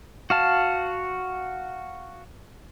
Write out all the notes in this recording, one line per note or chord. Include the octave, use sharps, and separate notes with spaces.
F#4 F5 A5